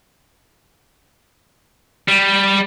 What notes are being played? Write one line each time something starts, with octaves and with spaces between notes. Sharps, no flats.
G3